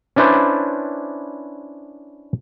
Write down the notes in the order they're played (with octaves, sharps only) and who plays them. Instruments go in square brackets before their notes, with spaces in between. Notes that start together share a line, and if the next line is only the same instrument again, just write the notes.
[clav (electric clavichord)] C#4 D4 E4 B4 C5 D5